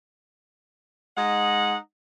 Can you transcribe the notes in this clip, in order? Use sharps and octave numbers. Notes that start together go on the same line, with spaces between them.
G#3 D#4 D#5 F#5